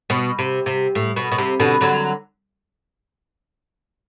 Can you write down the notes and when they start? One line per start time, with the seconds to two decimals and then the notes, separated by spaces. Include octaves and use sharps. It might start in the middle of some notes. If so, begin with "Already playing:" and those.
0.10 B2
0.39 C3
0.66 C3
0.95 A2
1.16 B2
1.32 B2
1.38 C3
1.60 B2 D3
1.81 D3 F#3